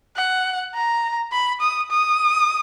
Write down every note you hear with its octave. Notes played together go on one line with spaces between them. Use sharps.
F#5
A#5
B5
D#6
D#6